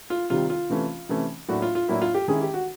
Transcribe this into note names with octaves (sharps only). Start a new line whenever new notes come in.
F4
C3 D#3 G3 F4
F4
C3 E3 A3 C#4
C3 E3 A3 C#4
A2 F#3 A#3 D4 F#4
F4
F4
A2 F#3 A#3 D4 E4
F4
G4
D#3 G#3 C#4 E4 G#4
G4
F#4